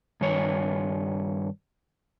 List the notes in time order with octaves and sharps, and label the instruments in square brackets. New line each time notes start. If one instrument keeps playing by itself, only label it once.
[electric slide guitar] G2 D#3 C#5